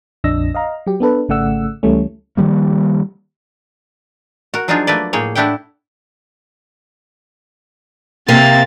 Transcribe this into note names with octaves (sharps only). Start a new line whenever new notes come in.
A#1 F2 D4 D#5 E6 A#6
D#5 F5 A#5
F#3 G4
B3 D4 A4 B4
G#1 C#3 A3 D5 F#5 E6
C#2 C#3 E3 G3 A3 C#4
D#3 F3 G3 A#3
F#4 A#4
F3 F#3 D4 D#4 F4 G#4
A3 A#3 B4 D5
A2 A#3 G#4 C#5
A3 D4 E4 G4 F#5 G5
C3 A#3 C4 A6